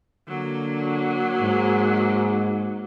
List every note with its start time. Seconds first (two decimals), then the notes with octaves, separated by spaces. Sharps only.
0.28 D3 F#3 A#3
1.41 G#2